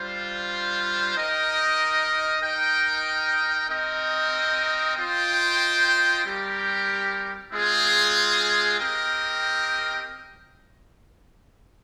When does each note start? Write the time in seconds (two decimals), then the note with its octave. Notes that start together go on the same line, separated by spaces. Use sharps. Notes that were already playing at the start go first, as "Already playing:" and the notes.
Already playing: G3 D4 F4 C5
1.14 D#4 A#4 D#5 G5
2.41 D#4 A#4 D#5 G5
3.69 C4 D#4 A#4 D#5 G5
4.96 F4 C5 D#5 G5
6.24 G3 C4 G4 A#4
7.51 G#3 C4 F4 G#4
8.79 C4 G4 A#4 D#5 G5